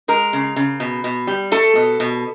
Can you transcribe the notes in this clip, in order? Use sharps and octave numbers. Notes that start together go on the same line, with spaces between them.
G#3 A#4
C#3
C#3
B2
B2
G3
A3 A4
B2
B2